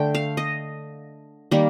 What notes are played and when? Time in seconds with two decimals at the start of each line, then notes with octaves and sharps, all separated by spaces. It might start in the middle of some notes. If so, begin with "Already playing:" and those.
Already playing: D3 A3 G5
0.15 F5
0.37 D#5
1.51 D#3 G3 A#3